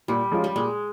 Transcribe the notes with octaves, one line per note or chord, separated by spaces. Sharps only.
A#2 G3
F3 G#3 C#4 F4
G3
A#2 G#3